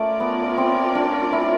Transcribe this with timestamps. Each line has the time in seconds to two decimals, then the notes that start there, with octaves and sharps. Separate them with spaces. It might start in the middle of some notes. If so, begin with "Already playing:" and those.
Already playing: A3 C#4 F4 A#4 D5
0.20 B3
0.58 C4
0.95 D4
1.33 E4